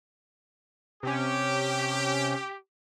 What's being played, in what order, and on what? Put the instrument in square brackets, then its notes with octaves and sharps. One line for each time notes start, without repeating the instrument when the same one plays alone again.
[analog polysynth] C3 C#4 [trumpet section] G4